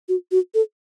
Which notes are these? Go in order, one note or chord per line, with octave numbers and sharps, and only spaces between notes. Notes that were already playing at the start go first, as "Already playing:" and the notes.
F#4
F#4
A4